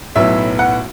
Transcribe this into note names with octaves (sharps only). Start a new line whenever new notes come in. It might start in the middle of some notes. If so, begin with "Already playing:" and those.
B1 A2 F#3 B3 E5
F#5